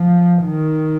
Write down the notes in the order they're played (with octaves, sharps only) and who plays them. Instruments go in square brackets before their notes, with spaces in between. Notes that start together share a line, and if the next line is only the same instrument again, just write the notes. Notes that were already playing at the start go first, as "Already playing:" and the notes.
Already playing: [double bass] F3
D#3